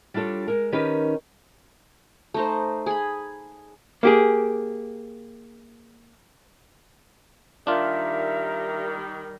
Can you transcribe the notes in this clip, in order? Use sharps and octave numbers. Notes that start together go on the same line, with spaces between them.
G3 D4 F4 A4 C#5
G#3 A#4
D#3 C#4 D#4 G4 A#4 B4
A3 D#4 C5
G#4 B5
A#3 G4 G#4
D#3 G3 D4 F4 A#4 E5